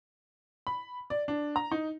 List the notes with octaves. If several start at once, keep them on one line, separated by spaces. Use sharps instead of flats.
B5
D5
D4
A#5
D#4